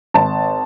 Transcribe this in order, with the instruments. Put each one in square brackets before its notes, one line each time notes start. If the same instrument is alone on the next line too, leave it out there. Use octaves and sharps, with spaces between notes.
[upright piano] G#1 A5